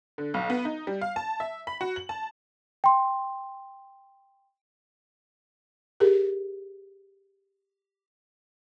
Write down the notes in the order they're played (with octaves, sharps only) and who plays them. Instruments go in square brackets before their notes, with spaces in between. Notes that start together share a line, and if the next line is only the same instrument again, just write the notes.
[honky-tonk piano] D3
B1
B3
D#4
G3
F5
A5
E5
B5
F#4
F#7
A5
[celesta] G5 C6
[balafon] G4 G#4 A#4